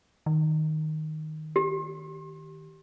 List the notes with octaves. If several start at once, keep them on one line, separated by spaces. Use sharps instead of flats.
D#3
G4